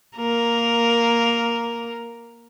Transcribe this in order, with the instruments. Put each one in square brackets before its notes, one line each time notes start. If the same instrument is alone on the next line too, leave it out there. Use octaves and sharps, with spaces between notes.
[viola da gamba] A#3 A#4